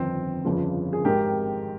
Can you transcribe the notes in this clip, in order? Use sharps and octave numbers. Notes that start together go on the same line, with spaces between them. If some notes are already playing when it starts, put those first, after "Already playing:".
Already playing: G1 F2 D#3 C4
G1 F2 C#3 F3
G#4
G#1 G#2 D#3 G4 A#4